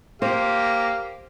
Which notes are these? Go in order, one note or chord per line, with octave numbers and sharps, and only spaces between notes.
A#3 G4 C5 F5